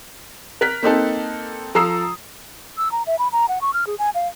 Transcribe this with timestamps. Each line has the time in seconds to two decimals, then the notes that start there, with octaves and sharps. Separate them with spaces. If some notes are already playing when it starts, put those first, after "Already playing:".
0.61 A#4 F#6 B6
0.83 A#3 C4 D#4 A4
1.75 F3 A4 A#5 D#6 E6 C7
2.77 E6
2.92 A#5
3.07 E5
3.19 B5
3.32 A#5
3.48 F#5
3.61 C#6
3.74 F6
3.87 G#4
3.99 G#5
4.15 F5